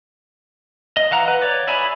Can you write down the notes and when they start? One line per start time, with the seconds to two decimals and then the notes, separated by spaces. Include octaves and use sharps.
0.97 D#5
1.11 E3 F5 F#5 A#5
1.28 B4
1.42 C#5 D5
1.68 E4 G#4 E5 G#5 B5